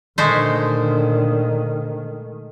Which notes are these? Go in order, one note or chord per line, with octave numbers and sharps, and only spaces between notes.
A#2 D3 D#3 G#3 A3 C5